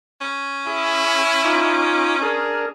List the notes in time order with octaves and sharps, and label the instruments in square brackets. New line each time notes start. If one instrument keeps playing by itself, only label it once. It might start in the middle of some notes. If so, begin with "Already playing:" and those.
[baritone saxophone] C#4
[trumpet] E4 [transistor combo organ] G#4
[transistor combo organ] D#4 F4 D6
[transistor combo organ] D4 A#4 [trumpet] G#4